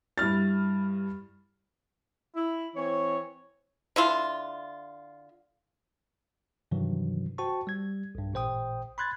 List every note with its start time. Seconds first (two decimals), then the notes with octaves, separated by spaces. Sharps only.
0.18 G2 E4 F6 A6
2.35 E4
2.76 E3 C4 C#5
3.96 D3 E4 F4
6.71 G2 C3 D#3 E3 F#3
7.38 F#4 C5 G5 A5 C#6
7.67 G3 G#6
8.15 B1 G2
8.34 A1 A#2 C5 G5 D#6
8.98 B5 C6 F#6 G#6 A6